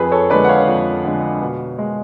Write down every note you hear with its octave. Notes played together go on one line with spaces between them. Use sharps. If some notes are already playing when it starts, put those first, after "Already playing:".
Already playing: F2 G#4 B4
A4 C#5
D3 G#3 B4 D5
F#5
C#5 F5
F2
D3 G#3
B2
G#3